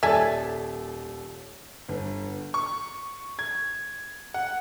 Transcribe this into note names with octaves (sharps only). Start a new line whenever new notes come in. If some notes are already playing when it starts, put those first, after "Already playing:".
D#1 A4 D5 E5 G#5 A5
G1
C#6
G#6
F#5